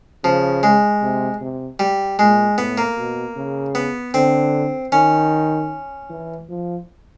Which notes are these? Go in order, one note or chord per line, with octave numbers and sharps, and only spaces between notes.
C#3 F3
G#3
C3
C3
G3
A#2 G#3
A2 B3
A#3
B2
C#3
B3
D3 C4
D#3 C#4
E3
F3